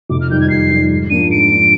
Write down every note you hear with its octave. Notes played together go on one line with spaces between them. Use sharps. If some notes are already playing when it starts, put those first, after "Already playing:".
F1 D6
F6
F2 D#3 G3 G6
G#6
F1 C7
F2 D#3 G3
G#2
F3 A#3 D4 D#7
G#2 D7
F3 A#3 D4